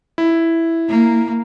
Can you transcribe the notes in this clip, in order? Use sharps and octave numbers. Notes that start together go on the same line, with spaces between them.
E4
A#3